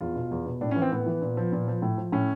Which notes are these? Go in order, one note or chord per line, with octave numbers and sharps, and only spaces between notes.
E2 F4
B2
E2
B2
A2 D4
C#4
E3
C4
A2 B3
E3
A#2
F3
A#2
F3
A2
F3
A2 C#4